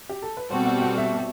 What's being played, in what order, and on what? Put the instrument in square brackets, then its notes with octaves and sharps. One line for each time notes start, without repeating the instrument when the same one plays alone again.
[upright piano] G4
A4
B4
[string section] B2 G3 C4 F#4 A4 [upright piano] C5
[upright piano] F#5
F#5
E5